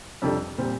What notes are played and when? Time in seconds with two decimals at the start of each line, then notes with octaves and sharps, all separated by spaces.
0.22 F2 C3 G3 D4 A4
0.58 A#2 G3 C4